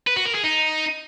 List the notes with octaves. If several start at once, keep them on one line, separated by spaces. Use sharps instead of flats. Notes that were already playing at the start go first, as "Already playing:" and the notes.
B4
F#4
A#4
G#4
D#4